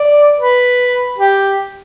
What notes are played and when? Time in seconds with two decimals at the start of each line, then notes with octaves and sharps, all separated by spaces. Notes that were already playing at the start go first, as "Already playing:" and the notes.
Already playing: D5
0.40 B4
1.18 G4